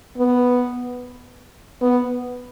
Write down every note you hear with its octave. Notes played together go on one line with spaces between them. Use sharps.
B3
B3